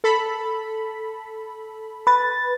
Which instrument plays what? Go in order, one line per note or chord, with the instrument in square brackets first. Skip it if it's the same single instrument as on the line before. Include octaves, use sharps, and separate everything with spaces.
[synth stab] A4 B5
[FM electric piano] B4 A6